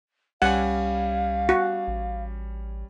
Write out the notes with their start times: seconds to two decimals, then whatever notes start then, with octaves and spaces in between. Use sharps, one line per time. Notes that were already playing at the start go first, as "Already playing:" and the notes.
0.42 C2 G3 C#4 F5 F#5 G#5
1.49 F#4
1.87 A1